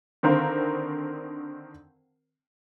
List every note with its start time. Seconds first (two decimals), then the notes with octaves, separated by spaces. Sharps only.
0.23 D3 D#3 C4 A#4 C5 F5